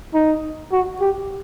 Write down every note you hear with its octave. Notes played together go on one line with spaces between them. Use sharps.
D#4
F#4
G4